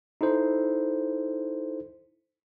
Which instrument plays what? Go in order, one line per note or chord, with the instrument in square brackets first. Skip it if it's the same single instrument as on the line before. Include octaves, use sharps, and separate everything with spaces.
[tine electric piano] D#4 E4 A4 C5